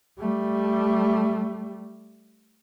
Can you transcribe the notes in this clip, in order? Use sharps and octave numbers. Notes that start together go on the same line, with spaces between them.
G3 A3